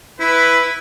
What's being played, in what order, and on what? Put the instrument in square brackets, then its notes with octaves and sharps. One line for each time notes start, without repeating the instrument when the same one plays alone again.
[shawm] E4 [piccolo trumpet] B4